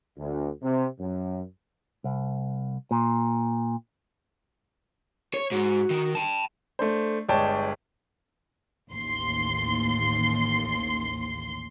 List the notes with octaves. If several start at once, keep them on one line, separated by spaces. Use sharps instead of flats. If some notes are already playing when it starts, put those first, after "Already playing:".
D2
C3
F#2
C2
A#2
C#5
G#2 F#4
D#3
G5 A5
A3 D4 C5
G1 G#3 C#5 D5 G5 A5
A1 D#2 C6